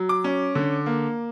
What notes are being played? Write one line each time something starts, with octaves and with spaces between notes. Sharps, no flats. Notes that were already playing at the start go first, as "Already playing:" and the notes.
Already playing: F#3
D6
C#4
D3
A#3